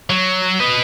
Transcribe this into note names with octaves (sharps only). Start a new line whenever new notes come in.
F#3
B4 D#5